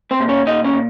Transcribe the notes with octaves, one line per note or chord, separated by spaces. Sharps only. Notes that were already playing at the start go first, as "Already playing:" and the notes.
C4 C5
A#2
C#4 C#5
A#2 D#4 D#5
C#4 C#5
A#2